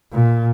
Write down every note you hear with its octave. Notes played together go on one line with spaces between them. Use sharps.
A#2